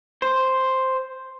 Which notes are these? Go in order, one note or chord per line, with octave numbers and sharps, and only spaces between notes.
C5